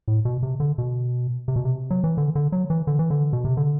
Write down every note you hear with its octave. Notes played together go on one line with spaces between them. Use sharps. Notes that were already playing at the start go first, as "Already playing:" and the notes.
A2
B2
C3
D3
B2
C3
B2
C3
F#3
E3
D3
D3
F#3
E3
D3
E3
D3
B2
C3
D3